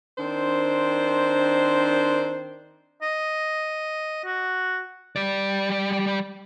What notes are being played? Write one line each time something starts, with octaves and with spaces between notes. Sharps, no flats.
D#3 C4 D4 C5
D#5
F#4
G3 D5